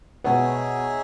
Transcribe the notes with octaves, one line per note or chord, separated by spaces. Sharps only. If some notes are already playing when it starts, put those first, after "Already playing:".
B2 B3 D#4 G#4 C#5 E5